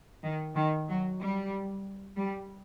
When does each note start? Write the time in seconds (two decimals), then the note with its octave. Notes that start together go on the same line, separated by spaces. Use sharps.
0.24 D#3
0.56 D#3
0.88 F#3
1.20 G3
2.17 G3